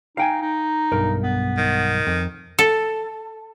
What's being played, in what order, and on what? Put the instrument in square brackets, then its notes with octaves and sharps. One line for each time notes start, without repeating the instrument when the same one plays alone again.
[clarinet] D#4 [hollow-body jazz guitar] F5 G5 G#5
[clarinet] D#4
[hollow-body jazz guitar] B1 G2 A#4
[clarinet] B3
[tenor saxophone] D#3
[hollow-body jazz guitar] F2
[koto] A4